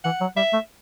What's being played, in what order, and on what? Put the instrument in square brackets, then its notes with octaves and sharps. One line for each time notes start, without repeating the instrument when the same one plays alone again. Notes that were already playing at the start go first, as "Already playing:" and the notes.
[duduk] E3 [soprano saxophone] F#5
[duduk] F#3
[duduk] G3 [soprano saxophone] E5
[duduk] A3